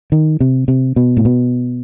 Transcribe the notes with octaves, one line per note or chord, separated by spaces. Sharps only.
D#3
C3
C3
B2
A2
B2